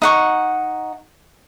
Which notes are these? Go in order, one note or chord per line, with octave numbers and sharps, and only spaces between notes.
D#4 F#5 C#6